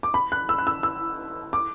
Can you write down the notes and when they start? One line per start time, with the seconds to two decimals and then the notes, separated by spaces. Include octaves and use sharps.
0.03 D6
0.14 B5
0.32 F#6
0.49 E6
0.58 F#6
0.67 E6
0.83 E6
1.53 D6